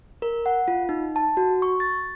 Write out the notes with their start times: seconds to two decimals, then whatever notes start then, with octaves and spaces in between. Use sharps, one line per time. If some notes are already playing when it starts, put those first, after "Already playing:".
0.22 A#4
0.46 F#5
0.68 F4
0.89 D#4
1.16 A5
1.37 F#4
1.62 C#6
1.80 A6